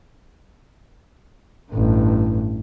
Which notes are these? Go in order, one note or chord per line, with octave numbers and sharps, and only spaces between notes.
A1 G2